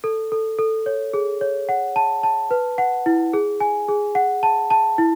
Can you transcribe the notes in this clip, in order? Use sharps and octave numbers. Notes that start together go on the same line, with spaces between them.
A4
A4
A4
C#5
G#4
C#5
F#5
A5
A5
B4
F#5
E4
G#4
G#5
G#4
F#5
A5
A5
E4